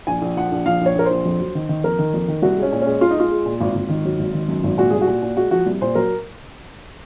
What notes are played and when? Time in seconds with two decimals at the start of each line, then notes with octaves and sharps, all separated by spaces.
0.07 A#1 G#5
0.22 A#1
0.37 F3 F#5
0.52 A#1
0.66 F3 F5
0.81 A#1
0.86 C#5
0.95 A#1 A#4
1.06 A#1 C5
1.25 F2
1.40 F#3
1.55 D#3
1.69 D#3
1.84 F2 A#4
1.99 D#3
2.14 F2
2.28 D#3
2.42 C2 F#4
2.57 G#3
2.63 C#4
2.72 A#2
2.82 G#3 C#4
3.01 G#3 F4
3.11 D#4
3.16 G#3 F4
3.31 G#3
3.46 A#2
3.61 G#1
3.75 G#1
3.89 D#3
4.05 F#3
4.19 G#1
4.34 D#3
4.49 F#2
4.63 G#1
4.78 A#2 F#4
4.91 C2 G#4
5.02 F#4
5.07 A#2
5.22 A#2
5.37 G#3 F#4
5.51 F3 F#4
5.66 C2
5.81 A#2 C5
5.95 F#3 A#4